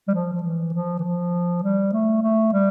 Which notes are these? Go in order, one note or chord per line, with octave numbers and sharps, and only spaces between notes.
G3
F3
F3
E3
F3
E3
F3
G3
A3
A3
G3